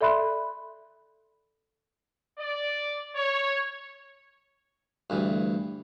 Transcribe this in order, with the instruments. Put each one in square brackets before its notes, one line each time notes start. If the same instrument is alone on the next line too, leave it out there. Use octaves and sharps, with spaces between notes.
[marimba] A4 D5 E5 B5 C6 F#6
[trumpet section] D5
C#5
[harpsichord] D2 G2 E3